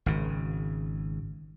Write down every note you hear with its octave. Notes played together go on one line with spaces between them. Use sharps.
G#1 C#3